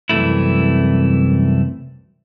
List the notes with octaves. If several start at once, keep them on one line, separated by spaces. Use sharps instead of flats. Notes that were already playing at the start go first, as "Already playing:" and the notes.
C2 F#2 C3 E3 A3 E4